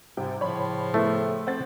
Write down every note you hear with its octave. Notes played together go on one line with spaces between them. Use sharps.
G#2 C3 G3 G5
A2 C#3 F3 C#5 B5
A3 B3 E4 A4
C4 F#5 A6